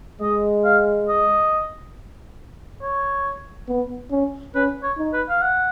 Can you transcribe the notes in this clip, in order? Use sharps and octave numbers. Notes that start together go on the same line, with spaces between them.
G#3 D#5
F5
D#5
C#5
B3
C#4
C#4 B4
C#5
D#4
B4
F5
F#5